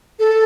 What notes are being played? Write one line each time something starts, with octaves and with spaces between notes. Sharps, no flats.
A4